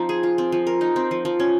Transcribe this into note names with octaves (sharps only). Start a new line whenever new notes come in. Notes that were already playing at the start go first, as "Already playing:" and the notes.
Already playing: F3 C4 D#4
G#4
F4
C4
F3
A#4
D#4
C4
F3
F3
C#4